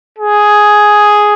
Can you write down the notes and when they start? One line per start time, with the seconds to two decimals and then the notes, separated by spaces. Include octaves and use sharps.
0.18 G#4